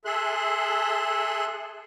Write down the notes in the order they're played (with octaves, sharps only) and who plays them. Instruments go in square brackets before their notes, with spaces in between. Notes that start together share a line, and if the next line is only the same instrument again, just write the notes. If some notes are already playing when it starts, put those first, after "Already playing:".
[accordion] G#4 A4 E5 C6 F#6